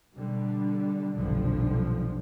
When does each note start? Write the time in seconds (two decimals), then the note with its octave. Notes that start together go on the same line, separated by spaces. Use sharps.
0.15 B2 D3 G3
1.13 F1 B1 G2 A#2 D3 F3